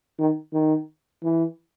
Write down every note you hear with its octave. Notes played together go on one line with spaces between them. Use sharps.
D#3
D#3
E3